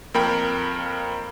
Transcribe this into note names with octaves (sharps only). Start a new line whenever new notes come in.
F2 A#3 A#4 G5 B5